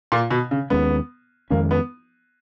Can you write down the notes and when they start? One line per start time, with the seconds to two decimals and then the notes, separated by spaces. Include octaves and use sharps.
0.12 A#2
0.30 B2
0.51 C#3
0.70 D#2 D#3 G#3 B3 C#4
1.50 F2 D#3 G#3 A#3 C#4
1.71 B3